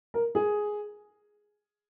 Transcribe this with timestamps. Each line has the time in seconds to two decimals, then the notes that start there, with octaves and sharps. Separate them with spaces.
0.14 A#4
0.35 G#4